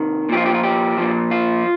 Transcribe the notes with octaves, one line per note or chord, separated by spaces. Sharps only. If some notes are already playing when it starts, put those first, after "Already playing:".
Already playing: C3 D#3
A#2 F3 G4
F4
G4
F4
G4
A#2 F3
F4